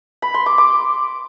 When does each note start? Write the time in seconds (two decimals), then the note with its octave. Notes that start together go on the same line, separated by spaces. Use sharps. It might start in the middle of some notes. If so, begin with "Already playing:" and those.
0.22 B5
0.34 C6
0.46 D6
0.58 D6